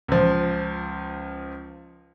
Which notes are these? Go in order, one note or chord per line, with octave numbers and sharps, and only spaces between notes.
C#2 F3